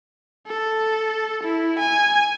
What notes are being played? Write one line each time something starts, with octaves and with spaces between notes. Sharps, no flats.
A4
E4
G#5